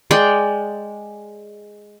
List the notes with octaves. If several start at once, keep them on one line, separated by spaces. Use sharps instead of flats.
G#3 D5 G5